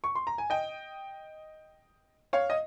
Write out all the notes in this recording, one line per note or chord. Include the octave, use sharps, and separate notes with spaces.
C#6
C6
A#5
G#5
D#5 G5
C#5 F5
D#5